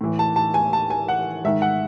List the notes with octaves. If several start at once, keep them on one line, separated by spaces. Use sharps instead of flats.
A2 E3
A5
A5
G#5
A5
G#5
F#5
G#2 D#3 E5
F#5